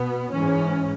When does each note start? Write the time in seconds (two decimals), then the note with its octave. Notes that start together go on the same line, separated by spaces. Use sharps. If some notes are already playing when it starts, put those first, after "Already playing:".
Already playing: B2 B3
0.30 G#2 E3 C#4